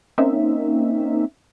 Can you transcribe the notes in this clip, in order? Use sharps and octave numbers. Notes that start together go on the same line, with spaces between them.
A#3 C4 C#4 D#4 E5